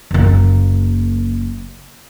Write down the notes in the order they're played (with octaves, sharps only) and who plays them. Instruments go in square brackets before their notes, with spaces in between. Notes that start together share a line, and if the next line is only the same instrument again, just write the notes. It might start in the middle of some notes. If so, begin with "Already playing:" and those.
[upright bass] F#1 A#3